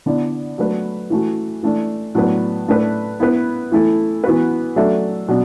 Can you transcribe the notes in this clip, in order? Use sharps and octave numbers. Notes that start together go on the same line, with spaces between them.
D3 B3 E4 D5
F#3 A3 D4 B4
E3 A3 F#4
E3 A3 D4
A2 F#3 B3 D4 B4
A2 A3 D4 B4
B3 E4 B4
E3 A3 E4 A4
E3 B3 F#4 B4
F#3 A3 D4 A4 E5
B2 F#3 D4